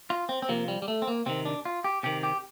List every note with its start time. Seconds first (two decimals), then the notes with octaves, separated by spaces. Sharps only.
0.10 F4
0.29 C4
0.42 C4
0.49 C3 F3 A#3
0.68 G3
0.82 G3
0.88 A3
1.02 C4
1.08 A#3
1.26 C3 D#3 C4
1.45 D4
1.65 F4
1.84 G4
2.03 C3 D#3 G4
2.23 G4